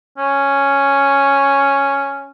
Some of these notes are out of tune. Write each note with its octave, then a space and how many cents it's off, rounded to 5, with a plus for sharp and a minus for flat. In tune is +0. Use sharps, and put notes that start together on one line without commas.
C#4 +0